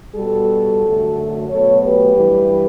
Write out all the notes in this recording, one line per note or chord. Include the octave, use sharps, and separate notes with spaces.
B2 G3 F#4 A4
F#2 D3 F#3 A3
B2 F#3 A3 A4 C#5
G4 B4
G2 E3 G3